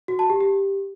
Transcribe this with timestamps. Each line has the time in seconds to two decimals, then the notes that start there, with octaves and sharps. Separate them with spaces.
0.08 F#4
0.19 A5
0.30 G4
0.40 G4